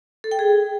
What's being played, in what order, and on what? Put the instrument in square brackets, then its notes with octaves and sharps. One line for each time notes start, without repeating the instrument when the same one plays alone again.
[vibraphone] A4
G5
G#4